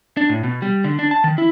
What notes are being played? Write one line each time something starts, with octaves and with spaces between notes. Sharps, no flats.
D4
A2
B2
G3
D3
D4
A5
D#3
E4